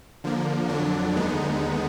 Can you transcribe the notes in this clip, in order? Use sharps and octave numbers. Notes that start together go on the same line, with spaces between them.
D3 F3 A#3
F2 D3 F#3 D4
D#2 D3 G#3 B3 D#4